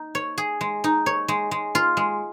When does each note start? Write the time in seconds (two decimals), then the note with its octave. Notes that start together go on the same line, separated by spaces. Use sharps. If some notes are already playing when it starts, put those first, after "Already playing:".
Already playing: D#4
0.15 C#5
0.38 G#4
0.61 G#3
0.84 D#4
1.06 C#5
1.28 G#3
1.51 G#3
1.75 F4
1.97 G#3